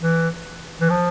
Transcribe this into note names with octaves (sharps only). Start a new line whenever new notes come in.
E3
E3
F3